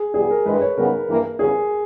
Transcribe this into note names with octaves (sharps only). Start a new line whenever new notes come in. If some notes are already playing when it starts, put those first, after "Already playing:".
Already playing: G#4
E2 B2 G3 G#4
A#4
G2 E3 G#3 B4
C#5
C#3 G3 B3 D#4 A#4
G2 E3 A#3
E2 C#3 G3 C#4 G#4